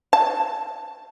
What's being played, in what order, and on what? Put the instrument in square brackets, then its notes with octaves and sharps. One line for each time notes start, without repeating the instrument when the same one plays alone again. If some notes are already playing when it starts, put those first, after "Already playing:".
[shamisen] A5